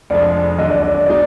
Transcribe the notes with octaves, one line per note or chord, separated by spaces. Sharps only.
F1 F2 F3 G#3 D4 D5
D#2 D3 F#3 D#5
D5
D5
D5
B2 G#3 D#4 D5